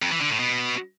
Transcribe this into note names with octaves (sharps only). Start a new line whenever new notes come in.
F2
E3
D3
A2
B2